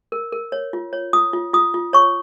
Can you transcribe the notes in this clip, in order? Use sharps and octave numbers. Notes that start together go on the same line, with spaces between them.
A#4
A#4
C#5
F4
C#5
F4 D#6
F4
F4 D#6
F4
C#5 C#6